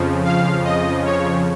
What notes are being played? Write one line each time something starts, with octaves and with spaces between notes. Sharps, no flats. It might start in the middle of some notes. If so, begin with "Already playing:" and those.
Already playing: F2 C#3 F3
F5
D#5
C#5